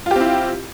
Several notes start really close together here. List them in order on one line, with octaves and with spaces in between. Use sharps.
F4 G4 C4 E4